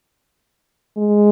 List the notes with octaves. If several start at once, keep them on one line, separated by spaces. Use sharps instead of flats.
G#3